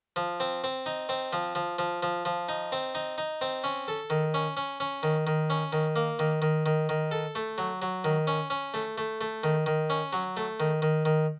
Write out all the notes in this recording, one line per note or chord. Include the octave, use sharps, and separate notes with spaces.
F3
C4
C4
D#4
C4
F3
F3
F3
F3
F3
D#4
C4
D#4
D#4
C4
C#4
A4
D#3
C#4
C#4
C#4
D#3
D#3
C#4
D#3
A#3
D#3
D#3
D#3
D#3
A4
A3
F#3
F#3
D#3
C#4
C#4
A3
A3
A3
D#3
D#3
C#4
F#3
A3
D#3
D#3
D#3